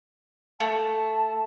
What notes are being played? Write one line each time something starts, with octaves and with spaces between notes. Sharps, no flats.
A3 A5